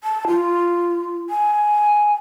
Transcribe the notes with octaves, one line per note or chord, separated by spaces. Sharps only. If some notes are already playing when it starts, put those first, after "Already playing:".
A5
F4
G#5